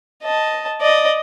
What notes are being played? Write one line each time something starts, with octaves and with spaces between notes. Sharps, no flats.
D#5 A5
D5 D#5